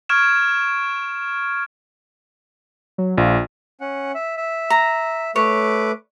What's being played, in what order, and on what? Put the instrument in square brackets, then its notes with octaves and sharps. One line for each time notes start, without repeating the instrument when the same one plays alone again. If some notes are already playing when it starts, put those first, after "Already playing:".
[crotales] C#6 F6 G#6 D7 E7
[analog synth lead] F#3
[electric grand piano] A#1 [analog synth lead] F4
[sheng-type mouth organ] C#4 F#5
E5
E5
[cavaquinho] A#5
[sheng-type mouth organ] A3 B4 D6 [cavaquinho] C#5